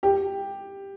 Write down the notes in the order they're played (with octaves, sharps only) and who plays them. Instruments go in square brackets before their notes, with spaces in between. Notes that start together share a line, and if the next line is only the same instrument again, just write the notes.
[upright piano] G4